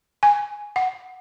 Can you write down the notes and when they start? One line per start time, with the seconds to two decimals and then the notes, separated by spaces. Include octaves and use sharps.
0.23 G#5
0.76 F#5